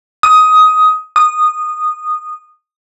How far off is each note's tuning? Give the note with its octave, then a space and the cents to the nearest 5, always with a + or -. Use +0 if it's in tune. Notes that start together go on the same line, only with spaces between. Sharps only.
D#6 +15
D#6 -15